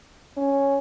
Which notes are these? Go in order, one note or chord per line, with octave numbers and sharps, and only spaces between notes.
C#4